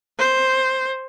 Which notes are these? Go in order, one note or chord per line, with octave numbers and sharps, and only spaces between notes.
C5